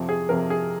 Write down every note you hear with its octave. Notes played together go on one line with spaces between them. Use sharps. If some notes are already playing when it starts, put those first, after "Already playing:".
Already playing: F2 C3 F3
G#4
F2 C3 F3 A#4
G#4